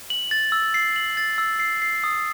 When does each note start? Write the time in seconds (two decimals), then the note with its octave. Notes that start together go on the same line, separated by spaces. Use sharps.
0.10 F#7
0.31 A6
0.52 E6
0.74 C7
0.96 F#7
1.17 A6
1.38 E6
1.60 C7
1.82 C7
2.04 D#6